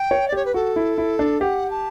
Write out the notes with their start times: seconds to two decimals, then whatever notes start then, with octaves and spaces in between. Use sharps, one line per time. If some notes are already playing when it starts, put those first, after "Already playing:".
Already playing: G5
0.11 C#5
0.28 D5
0.32 G4 C#5
0.45 B4
0.54 F#4 A4
0.76 E4
0.98 E4
1.19 D4
1.41 G4 F#5
1.70 A5